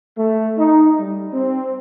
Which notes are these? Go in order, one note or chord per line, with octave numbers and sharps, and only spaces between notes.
A3
D#4
G3
C4